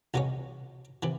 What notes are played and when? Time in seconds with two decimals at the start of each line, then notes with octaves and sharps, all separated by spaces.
0.14 C2 B2 G#3 C#4
1.03 C3 E3